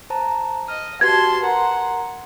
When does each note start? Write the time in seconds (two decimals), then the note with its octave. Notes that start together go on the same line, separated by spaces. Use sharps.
0.10 C5 A5 A#5
0.68 D#5 F6
1.01 F#4 G4 B4 A5 C6 G#6
1.42 A#4 F#5 A#5 C6